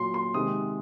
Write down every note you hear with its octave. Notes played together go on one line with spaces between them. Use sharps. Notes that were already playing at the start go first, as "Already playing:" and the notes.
Already playing: A#2 F#3 C6
C6
C3 D#3 G#3 D#6